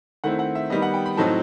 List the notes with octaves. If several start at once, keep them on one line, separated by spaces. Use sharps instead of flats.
D#3 A3 C4 E4 F#5
F#5
E5
D#3 G3 B3 D#5
F#5
G5
B5
A2 F#3 C4 D#4 A5